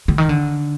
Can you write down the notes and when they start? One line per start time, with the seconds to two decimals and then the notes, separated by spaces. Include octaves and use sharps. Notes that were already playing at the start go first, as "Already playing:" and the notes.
0.08 D3
0.18 D#3
0.29 D3